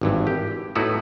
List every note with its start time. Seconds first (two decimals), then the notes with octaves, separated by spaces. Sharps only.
0.01 G#1 G2 E3
0.27 G4
0.75 A2 A3 B3 D#4 E4 F#4